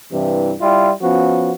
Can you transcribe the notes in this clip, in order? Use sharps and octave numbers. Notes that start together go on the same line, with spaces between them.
G2 C3 E3
G3 E4 F4
F3 B3 C#4 F#4